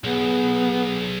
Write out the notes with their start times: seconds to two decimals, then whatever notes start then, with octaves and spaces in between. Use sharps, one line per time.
0.04 B1 B3 G#4